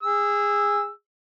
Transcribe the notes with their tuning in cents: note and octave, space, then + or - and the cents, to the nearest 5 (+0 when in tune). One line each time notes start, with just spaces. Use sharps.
G#4 -20 E6 +0